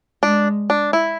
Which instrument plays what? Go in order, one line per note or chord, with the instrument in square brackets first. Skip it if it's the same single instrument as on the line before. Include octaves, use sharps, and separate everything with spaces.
[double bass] G#3 [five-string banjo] D4
[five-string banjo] D4
E4